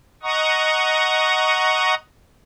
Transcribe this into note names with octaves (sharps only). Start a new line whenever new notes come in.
D#5 F#5 A#5 C#6 D#6